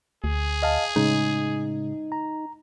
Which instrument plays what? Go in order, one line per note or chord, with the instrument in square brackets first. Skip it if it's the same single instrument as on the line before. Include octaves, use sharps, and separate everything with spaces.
[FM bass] D2 [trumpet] G#4
[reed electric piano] D#5 F5 A5
[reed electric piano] A2 C#3 G#3 [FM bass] D#4
[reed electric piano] A#5